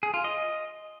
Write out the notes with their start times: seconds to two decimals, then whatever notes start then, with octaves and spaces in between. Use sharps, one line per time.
0.03 G#4
0.14 F4
0.24 D#5